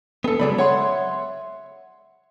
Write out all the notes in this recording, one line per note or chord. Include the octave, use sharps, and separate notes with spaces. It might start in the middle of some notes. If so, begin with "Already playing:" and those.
B3 G#4 A4
C#3 F#3 G#3 G#4 D5 B5
C#5 E5 F#5 C6